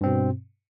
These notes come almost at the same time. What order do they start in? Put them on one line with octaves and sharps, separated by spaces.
G2 C4 B2